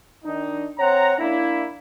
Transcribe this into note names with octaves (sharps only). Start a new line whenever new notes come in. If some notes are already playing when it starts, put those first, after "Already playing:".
D#3 D4 D#4
C4 C#5 F#5 A#5
A#3 D4 E4